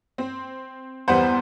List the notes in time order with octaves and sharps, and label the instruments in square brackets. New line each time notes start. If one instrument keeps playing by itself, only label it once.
[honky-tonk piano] C4
[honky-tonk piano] E2 G3 B3 [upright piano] C5 F#5